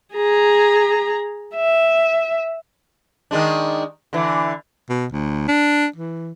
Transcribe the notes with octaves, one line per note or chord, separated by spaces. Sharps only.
G#4 A#5
E5
D#3 G#3 D4
D3 E3
B2
D2
D4
E3